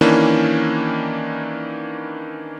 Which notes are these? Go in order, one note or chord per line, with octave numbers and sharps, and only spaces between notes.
D#3 E3 A#3 C#4 D4 E4